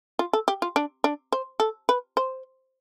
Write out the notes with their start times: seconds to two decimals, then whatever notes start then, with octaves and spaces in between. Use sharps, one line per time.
0.19 F4
0.33 A4
0.48 G4
0.62 F4
0.76 D4
1.04 D4
1.32 C5
1.60 A4
1.89 B4
2.17 C5